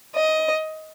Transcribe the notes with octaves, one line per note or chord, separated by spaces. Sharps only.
D#5